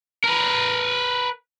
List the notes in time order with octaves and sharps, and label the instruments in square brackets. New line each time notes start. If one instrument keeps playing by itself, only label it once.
[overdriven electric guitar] A#4 B4